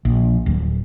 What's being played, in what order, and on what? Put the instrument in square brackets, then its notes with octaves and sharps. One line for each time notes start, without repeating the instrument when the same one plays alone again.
[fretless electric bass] A#1
D1